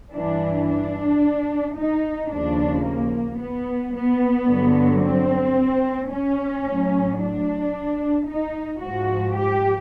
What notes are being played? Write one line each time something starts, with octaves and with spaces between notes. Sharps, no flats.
G2 E3 D4
D4
D#4
D#2 C#3 F3 D4
A#3
B3
B3
G2 D3 F#3
C4
C#4
A2 F#3
D4
D#4
G#2 F3 F#4
G4